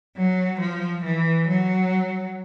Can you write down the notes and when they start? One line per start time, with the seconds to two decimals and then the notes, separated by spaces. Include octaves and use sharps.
0.17 F#3
0.60 F3
1.04 E3
1.48 F#3